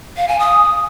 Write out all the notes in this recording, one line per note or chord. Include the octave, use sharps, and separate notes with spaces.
F5
G#5
D#6